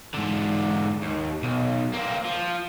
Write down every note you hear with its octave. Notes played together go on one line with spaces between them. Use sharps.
G#2 D3
D#2
B1
A#3 C4
F3